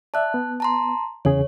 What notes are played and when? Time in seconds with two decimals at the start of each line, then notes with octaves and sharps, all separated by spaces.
0.14 D5 E5 A5 F#6
0.34 B3
0.60 A5 A#5 C6
1.25 E2 C#3 G#4 C#5